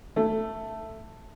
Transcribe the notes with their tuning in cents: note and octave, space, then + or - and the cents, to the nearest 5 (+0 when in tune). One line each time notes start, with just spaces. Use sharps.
A3 +5